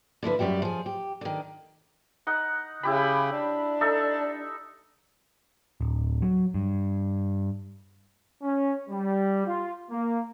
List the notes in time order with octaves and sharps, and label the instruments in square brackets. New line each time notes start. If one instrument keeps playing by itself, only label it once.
[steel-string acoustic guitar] D3 F3 E4 B4
F#2 B2 G3 G4 E5
F3 G#4
G4
D3 D#3
[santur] D#4 F#5
[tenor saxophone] C#3 [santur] E4 G4 B5
[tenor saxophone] D4
[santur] D#4 A4 E5
[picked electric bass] D1
F#3
G2
[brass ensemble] C#4
G3
F4
A#3